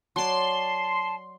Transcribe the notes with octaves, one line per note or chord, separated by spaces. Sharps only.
F#3 D5 A5 C6